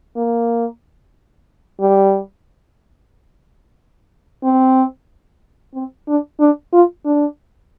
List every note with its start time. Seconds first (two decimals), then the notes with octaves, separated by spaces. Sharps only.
0.16 A#3
1.80 G3
4.43 C4
5.74 C4
6.08 D4
6.40 D4
6.73 F4
7.05 D4